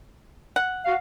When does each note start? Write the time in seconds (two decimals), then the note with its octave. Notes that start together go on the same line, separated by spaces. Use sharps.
0.56 F#5
0.85 F#4 F5